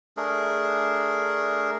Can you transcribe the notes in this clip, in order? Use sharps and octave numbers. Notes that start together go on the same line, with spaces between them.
A3 D4 G#4 A#4